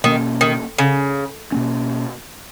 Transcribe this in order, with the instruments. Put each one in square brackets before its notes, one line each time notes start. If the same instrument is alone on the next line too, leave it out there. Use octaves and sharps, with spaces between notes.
[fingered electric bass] B2 A#3 C#4 [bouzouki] D#3
[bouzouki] D#3
C#3
[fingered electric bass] B2 A#3 C#4